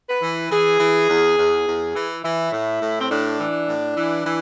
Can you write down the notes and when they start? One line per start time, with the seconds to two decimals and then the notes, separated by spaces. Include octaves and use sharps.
0.08 B4
0.22 E3
0.51 E3 G#4
0.79 E3
1.09 E2
1.37 E2
1.66 E2
1.95 E3
2.24 E3 E4
2.52 A2
2.81 A2
3.00 C4
3.10 A2 D4
3.39 E3
3.67 A2
3.97 E3
4.25 E3